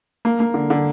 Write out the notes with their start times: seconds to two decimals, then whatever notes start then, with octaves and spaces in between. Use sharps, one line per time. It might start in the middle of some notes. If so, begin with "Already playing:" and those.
0.25 A#3
0.40 A#3
0.54 D3
0.70 D3